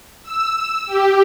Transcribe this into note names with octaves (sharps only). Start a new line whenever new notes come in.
E6
G4